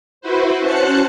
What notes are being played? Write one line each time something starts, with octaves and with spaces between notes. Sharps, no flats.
E4 F#4 B4 C5
C#4 F#4 C5 A5 F#6 C#7